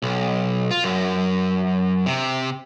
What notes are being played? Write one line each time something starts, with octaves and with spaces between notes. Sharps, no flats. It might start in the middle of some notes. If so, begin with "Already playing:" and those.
B1
F4
F#2
C3